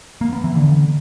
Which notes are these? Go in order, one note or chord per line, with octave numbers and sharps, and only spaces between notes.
A#3
B3
E3
D3